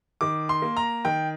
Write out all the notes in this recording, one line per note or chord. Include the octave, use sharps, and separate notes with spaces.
D#3 D6
C6
A#3
A#5
D#3 G5